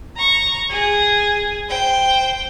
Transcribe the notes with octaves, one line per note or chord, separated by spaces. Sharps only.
A#5 C#6
G#4
C5 G5